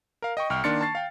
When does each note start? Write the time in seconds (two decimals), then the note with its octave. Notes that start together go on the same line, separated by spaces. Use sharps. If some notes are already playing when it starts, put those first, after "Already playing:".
0.22 A#4 F5
0.37 D#5 G5 C#6
0.50 C2 G5 C#6 F6
0.64 D#3 A#3 D4 C6 A6 C#7
0.81 A5 C#6 A6 C7
0.95 F5 G5